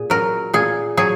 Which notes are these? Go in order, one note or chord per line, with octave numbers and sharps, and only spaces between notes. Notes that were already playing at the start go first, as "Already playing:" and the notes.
Already playing: A#2 G#4
F#3 A#4
A#2 G#4
F#3 G#4